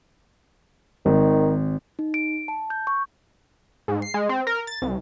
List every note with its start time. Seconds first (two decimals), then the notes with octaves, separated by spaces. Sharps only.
1.06 G#1 D#3
1.99 D#4
2.14 D7
2.48 A5
2.70 G6
2.87 C#6
3.88 G#2
4.02 C7
4.14 G#3
4.29 C4
4.47 A#4
4.67 A6
4.82 C2